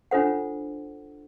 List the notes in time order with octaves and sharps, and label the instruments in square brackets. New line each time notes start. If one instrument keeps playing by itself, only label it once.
[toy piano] D4 F4 A4 C5 F#5